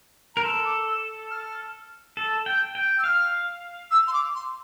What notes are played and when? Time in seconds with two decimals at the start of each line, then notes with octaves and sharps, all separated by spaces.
0.34 A#4 A#5
0.43 A4 C6
0.65 D6
0.87 E6
1.30 F6
2.17 A4
2.46 G5
2.75 G5
2.98 E6
3.03 F5 F6
3.91 E6
4.07 C6
4.13 D6
4.34 C6